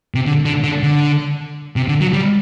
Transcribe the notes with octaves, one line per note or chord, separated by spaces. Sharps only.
C3
D3
D3
D3
D3
C3
D3
F#3
G3